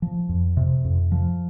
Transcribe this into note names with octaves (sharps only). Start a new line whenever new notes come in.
F3
F2
C3
F2
F3